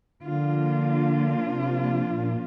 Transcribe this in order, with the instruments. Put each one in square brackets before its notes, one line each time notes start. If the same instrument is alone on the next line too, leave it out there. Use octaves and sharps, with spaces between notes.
[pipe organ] D3 [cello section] F3 A#3 D4 F4
[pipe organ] C3
A#2